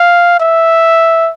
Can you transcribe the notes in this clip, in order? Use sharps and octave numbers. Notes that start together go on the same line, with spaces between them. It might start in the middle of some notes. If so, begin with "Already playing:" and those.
Already playing: F5
E5